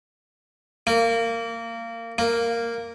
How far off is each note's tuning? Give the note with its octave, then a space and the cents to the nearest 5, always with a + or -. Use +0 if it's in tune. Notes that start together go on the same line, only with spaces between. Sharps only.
A#3 -20
A#3 -5